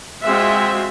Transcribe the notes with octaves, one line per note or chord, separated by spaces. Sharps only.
G#3 C4 F4 F#4 E5